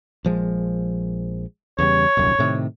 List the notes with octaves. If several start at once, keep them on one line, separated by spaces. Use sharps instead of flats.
A#1 F3 G#3
E2 C#3 G3 C#5
D#1 C2 F#2
A2 C3 D#3